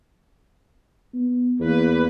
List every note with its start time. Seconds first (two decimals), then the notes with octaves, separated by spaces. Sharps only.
1.14 B3
1.60 E2 A#3 B4